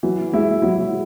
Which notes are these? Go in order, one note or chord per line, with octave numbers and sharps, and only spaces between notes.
E3 F#3
G#3 E4
F#3 E4